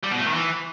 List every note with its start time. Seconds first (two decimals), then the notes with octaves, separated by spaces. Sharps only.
0.03 G3
0.11 B2
0.19 A3
0.26 D#3
0.34 E3